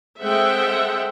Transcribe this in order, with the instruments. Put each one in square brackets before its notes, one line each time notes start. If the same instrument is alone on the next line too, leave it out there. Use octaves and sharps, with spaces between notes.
[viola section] G#3 C4 A4 E5 F#5 G5